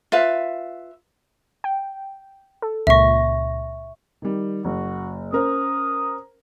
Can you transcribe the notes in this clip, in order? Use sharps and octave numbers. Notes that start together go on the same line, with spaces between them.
F4 B4 E5 F5
G5
A4
C#2 A#2 E5 C#6 A#6
D#3 G3
F#1 F#4
C#4 A#4 C5 D#6